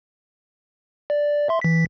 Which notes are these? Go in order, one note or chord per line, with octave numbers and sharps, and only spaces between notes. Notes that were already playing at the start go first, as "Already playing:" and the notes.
D5
E5 C6
E3 B6